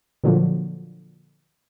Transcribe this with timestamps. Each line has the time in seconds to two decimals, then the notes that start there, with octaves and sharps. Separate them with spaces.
0.24 A#2 D3 F3 F#3